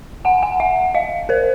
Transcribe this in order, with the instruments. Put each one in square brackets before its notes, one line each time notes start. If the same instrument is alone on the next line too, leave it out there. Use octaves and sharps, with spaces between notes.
[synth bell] F#5 G#5
F#5 G#5
E5 F#5
D#5 F5
A#4 C5